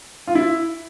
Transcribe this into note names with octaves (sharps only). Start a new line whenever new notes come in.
F4
E4